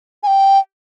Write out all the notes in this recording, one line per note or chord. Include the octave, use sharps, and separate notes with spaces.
G#5
G5